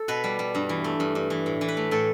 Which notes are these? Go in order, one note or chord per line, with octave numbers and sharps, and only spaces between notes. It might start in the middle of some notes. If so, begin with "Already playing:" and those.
Already playing: A4
B2 B4
G3
G3
G2
E3
A3
G2
G2
E3
A2
E3
B4
A3
A2 A4